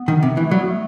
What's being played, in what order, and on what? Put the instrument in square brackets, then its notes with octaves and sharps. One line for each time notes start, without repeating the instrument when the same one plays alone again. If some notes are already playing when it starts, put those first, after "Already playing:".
Already playing: [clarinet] B3
[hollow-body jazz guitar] D#3
C3
E3
[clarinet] A3
[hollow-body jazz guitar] F#3 [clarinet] G3
[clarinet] B3
A3